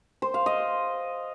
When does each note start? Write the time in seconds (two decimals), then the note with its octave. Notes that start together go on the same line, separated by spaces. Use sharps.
0.22 C5
0.34 F5
0.46 D#5